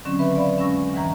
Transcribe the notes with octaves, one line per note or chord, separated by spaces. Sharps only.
D3 D#3 F#3 C4 C#4
B4 E5 B5
D5 E5 F5 B5
F2 G#3 C#4 C#6 E6 A#6
D2 G#2 D#3 E3 A#5